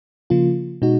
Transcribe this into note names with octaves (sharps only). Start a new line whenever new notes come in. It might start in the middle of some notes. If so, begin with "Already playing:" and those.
C#3 F3 A#3 F4
B2 G#3 D#4 F#4